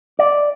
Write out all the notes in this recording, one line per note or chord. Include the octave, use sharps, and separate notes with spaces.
D5